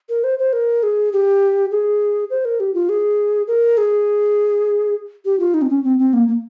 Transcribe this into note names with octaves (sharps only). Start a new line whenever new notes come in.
A#4
C5
C5
A#4
G#4
G4
G#4
C5
A#4
G4
F4
G#4
A#4
G#4
G4
F4
D#4
C4
C#4
C4
C4
A#3
A#3